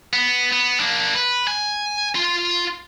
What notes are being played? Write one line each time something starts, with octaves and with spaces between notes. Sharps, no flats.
B3
B3
A#3 D4
B4
G#5
F4 C6